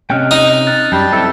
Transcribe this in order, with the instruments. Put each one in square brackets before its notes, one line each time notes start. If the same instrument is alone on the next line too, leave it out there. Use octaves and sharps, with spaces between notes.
[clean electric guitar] C3 C#4 G5 [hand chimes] D#5 F6 F#6
[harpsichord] D#4
[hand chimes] F6 F#6 A6
[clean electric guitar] F#2 [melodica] G3 G5 A5
[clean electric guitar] C4 E4 A4